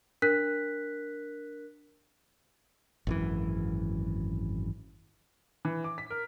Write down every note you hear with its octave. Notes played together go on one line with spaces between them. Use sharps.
D4 A#4 F#6 B6
G#1 F#2 E3
E3
D6
B6
A#4